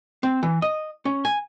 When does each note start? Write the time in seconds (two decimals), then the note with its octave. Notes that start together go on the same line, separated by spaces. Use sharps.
0.23 C4
0.43 E3
0.62 D#5
1.05 C#4
1.25 G#5